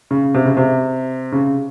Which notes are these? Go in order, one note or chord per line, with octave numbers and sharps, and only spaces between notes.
C#3
C3
C#3
C3
C#3